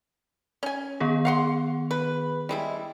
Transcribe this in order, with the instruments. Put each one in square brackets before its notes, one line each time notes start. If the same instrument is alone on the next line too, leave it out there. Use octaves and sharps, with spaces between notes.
[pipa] C#4 G#5
[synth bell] D#3 B3 G#4
[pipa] F5 F#5 C6
B4
G3 G#3 E4